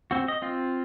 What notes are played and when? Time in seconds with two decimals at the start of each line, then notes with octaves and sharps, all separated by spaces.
0.11 C4 F#4
0.28 D#5
0.42 C4 F4